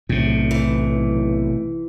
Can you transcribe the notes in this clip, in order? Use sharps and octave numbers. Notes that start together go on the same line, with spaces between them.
B1 A2 C3
E3